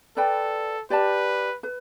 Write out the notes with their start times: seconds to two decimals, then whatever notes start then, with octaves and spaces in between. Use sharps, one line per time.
0.17 A4 B4 D5 G5 B5
0.90 G4 B4 D5 A5
1.63 B4